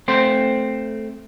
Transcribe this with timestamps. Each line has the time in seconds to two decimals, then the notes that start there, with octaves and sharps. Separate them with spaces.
0.08 A3 C4 C5